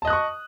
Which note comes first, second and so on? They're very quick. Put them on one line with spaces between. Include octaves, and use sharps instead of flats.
A5 D#5 F#6 D#6 C#6